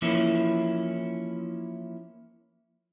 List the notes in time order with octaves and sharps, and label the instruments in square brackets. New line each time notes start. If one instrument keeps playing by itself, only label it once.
[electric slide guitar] E3 F3 A#3 C#4 E4